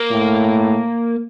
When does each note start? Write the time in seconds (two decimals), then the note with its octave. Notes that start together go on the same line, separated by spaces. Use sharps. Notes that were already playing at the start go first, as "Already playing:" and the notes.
Already playing: A#3
0.11 A2